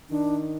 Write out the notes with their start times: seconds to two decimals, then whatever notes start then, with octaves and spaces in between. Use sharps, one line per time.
0.10 D#3 D4